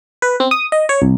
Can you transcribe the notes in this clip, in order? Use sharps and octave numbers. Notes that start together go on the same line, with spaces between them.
B4
C4
D#6
D#5
C#5
C2